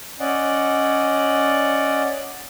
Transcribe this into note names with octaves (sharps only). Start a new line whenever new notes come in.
C#4 D5 D#5 F#5